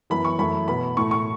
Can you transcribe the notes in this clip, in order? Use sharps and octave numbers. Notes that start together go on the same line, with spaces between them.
F#2 E3 B3 B5
C#6
F#2 E3 A3 B5
B2 B3 B5
A2 A3 C#6
C#6